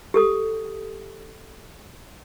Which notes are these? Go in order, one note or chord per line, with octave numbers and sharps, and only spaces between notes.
G4 A4 D#6